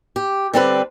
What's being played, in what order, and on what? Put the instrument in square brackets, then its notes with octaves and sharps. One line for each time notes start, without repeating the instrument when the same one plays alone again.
[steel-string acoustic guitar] G4
D3 G3 C4 D4 E4 B4